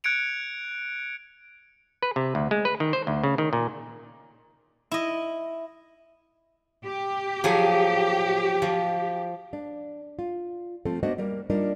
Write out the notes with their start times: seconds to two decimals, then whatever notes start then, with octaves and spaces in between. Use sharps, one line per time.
0.04 F#6 G#6 C#7 D7 F7
2.03 B4
2.16 C3
2.35 D2
2.51 G#3
2.65 B4
2.80 D#3
2.93 C5
3.07 D2
3.24 C#3
3.38 D#3
3.53 A#2
4.92 E4 D#5
6.85 G4
7.44 F3 F#3 G#4
8.62 F3
9.53 D4
10.19 F4
10.85 F3 A3 C4 F4 A4
11.03 A#3 B3 D4 F#4 C5 D#5
11.18 G3 A#3 A#4
11.50 G3 A#3 D4 D#4 F4 A#4